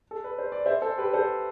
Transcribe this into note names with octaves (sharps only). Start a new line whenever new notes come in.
A4
B4
C5
D5
C5 E5
A4 C5
G4 B4
A4 C5